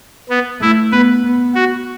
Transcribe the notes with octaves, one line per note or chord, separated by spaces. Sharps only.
B3
A3 E4
B3 B4
B3
F#4